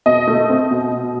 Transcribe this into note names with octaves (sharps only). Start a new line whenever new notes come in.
B2 D#5
A3
C4
B2
B2